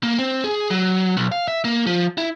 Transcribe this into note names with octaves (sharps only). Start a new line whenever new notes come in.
A#3
C4
G#4
F#3
B1
F5
E5
A#3
F3
E4